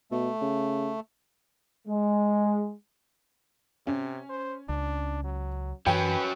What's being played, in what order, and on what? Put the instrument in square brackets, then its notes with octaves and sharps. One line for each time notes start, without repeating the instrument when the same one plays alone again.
[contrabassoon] B2 [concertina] A3
[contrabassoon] C#3
[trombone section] G#3
[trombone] C3 [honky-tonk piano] C#4
[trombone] C5
[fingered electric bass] C#2 [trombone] D4
[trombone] F#3
[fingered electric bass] F#2 E3 [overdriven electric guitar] F#3 C#4 [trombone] B4 [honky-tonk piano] G5